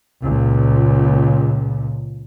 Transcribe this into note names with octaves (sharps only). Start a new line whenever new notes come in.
C#2 A#2